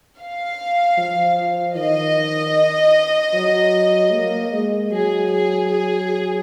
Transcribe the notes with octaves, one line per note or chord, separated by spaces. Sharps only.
F5
F3
D#3 D#5
F#3
A#3
G#3
F#3 G#4
G#4
G#4